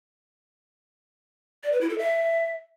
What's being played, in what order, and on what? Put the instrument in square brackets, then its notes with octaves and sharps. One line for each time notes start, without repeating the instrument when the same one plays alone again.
[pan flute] D5
B4
E4
A4
E5